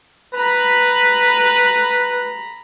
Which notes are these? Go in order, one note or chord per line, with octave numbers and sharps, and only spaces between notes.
B4 A#5 B5